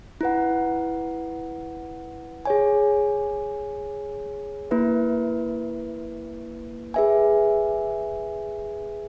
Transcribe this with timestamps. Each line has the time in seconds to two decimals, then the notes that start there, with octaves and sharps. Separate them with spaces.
0.21 E4 B4 F#5
2.45 G#4 C#5 G#5
4.71 A#3 E4 B4 E5
6.94 G#4 B4 E5 G#5